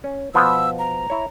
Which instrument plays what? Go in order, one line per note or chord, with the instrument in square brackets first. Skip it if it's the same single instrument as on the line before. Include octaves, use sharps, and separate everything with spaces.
[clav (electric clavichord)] C#4
[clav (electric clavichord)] B2 F3 B3 [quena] E6
[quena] A#5
[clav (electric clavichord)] E4 C#5